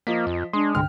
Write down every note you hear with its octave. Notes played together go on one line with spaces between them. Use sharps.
F3 A#3 D#5 B6
F2
G#3 D4 C6 D#6
C2 G2 D3 G5 F6